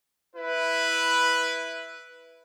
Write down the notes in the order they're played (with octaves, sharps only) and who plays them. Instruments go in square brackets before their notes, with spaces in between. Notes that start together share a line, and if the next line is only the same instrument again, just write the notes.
[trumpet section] E4 B4